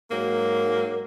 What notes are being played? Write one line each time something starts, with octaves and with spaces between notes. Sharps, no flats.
G#2 F#3 A#3